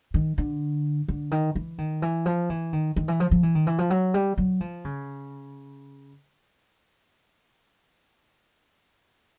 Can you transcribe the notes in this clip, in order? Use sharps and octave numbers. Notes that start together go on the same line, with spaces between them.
D#3
D3
D3
D#3
E3
D#3
E3
F3
E3
D#3
D#3
E3
F3
F3
E3
D#3
E3
F3
F#3
G3
F#3
F3
C#3